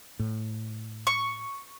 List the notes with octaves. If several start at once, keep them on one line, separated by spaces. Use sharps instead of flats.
A2
C#6